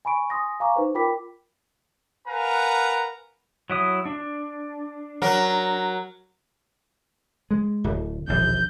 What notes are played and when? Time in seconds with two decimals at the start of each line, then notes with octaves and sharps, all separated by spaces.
0.05 G#5 B5 C#6 D7
0.30 G#5 C6 D#6 A#6
0.60 F5 G#5 A#5 C#6 D6
0.76 D#4 B4 C5
0.95 F4 A#4 G5 B5 D6 B6
2.28 A#4 B4 F5 F#5 G#5 A#5
3.70 F#3 E4 D#6
4.05 D4
5.22 F#3 A#4
7.51 G#3
7.84 D1
8.28 E1 A#1 D#2 G6